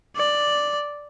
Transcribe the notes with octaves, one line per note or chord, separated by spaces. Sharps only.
D5